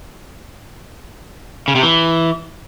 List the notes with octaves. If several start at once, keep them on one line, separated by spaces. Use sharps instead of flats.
C#3
C3
E3